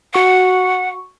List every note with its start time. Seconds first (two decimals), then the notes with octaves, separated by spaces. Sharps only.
0.15 F#4 F#5 C#6